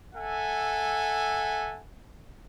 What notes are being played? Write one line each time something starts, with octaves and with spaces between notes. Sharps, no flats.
A4 E5 F#5 G#5